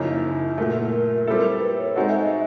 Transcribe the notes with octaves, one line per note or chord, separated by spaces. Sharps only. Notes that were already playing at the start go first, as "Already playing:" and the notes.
Already playing: F#2 C#3 F3 A#3 D#4 E4
A#2 F#3 A3 A#4
A#4
A#4
G3 C4 E4 A4
B4
C#5
G#3 C4 D#4 F#4 A4 F#5
E5
D#5
E5